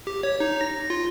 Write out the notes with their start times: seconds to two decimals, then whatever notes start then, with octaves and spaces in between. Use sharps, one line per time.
0.07 G4
0.23 C#5
0.40 D#4
0.61 A#6
0.90 F4